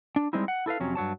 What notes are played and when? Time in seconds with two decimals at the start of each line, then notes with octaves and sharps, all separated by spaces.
0.16 D4
0.33 G3 G#3 C4 D#4 E4
0.48 F#5
0.66 E4 A4 B4 F5
0.80 F2 C3 F#3 C#4
0.95 G2 F#3 C#5 A5